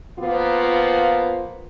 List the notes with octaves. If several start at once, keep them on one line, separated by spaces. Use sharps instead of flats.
F3 A#3 B3 F4